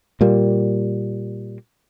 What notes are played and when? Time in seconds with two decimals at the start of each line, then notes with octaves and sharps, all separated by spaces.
0.21 A#2 G3 A#3